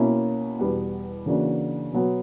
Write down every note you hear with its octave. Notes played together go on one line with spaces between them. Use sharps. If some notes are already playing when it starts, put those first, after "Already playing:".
Already playing: B2 A#3 C#4 E4
E2 B2 G3 B3
C#3 E3 A#3 D4 F#4
B2 F#3 B3